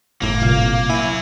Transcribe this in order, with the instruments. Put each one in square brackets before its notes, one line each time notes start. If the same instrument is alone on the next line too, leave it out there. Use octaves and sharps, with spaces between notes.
[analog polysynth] G1 A2 [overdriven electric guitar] A#3
[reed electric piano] C2 A#2 F5
[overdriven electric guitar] F#3 G#5 [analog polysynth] E4